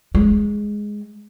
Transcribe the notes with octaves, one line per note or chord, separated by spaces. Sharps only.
G#3